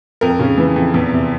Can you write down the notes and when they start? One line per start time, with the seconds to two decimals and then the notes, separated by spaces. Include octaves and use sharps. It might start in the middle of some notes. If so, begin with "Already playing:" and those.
0.21 F2 A#4
0.39 C#3
0.57 E3
0.76 F2
0.94 E2
1.12 C3